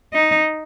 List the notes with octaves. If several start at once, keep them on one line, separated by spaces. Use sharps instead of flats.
D#4